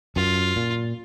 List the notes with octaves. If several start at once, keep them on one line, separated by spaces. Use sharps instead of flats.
F#2 F4
A#2